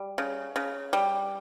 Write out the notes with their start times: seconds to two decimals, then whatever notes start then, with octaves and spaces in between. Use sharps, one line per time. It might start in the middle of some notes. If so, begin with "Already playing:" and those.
Already playing: G3
0.18 C#3
0.56 C#3
0.93 G3